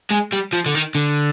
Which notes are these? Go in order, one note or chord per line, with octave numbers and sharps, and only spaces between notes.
G#3
G3
F3
D3
D#3
D3